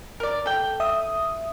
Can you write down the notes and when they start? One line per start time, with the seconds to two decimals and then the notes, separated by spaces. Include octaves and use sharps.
0.20 A#4 D5
0.46 A4 G5
0.80 E5 D#6